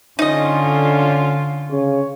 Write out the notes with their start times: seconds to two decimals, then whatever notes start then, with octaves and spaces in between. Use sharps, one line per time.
0.19 D3 C#4 D#4 F4 D#5
1.70 C#3 C#5